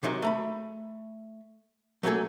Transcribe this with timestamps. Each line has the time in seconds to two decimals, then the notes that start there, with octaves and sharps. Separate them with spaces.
0.03 C3 D#3 F#3 G#3
0.22 A3 A#5 B5
2.03 F#3 A3 A#3 C#4 G#4 A4